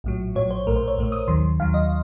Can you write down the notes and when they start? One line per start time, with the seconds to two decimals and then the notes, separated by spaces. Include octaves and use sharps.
0.04 A#1 A2 F#3
0.35 A#1 A2 F#3 C#5
0.51 C5
0.67 A#1 A2 A3 A#4
0.76 C5
0.88 C#5
0.98 A#1 A2 A3
1.12 D#6
1.28 D#2 D#3 F#3 C6
1.60 D#2 D#3 F#3 F5
1.74 D#5